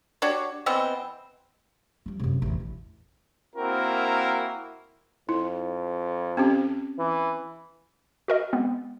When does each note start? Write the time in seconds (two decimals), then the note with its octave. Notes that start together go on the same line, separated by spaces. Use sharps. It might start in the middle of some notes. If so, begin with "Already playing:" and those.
0.22 D4 F#4 G4 C#5
0.66 E3 B3 C4 D#5
2.06 F3 G3
2.19 F#2 C3
2.42 A1 E2
2.60 E4
3.56 A#3 C4 E4 F#4 A#4
5.29 F2 E4
6.37 C4 C#4 G4
6.99 E3
8.28 F#4 A#4 D#5
8.53 G#3 B3 C4